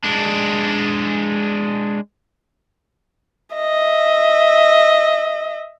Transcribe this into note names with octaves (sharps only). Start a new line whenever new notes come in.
G#3 D4
D#5 E5